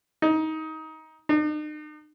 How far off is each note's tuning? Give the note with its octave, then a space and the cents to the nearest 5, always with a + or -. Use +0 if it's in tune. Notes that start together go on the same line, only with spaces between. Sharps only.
D#4 +20
D#4 -45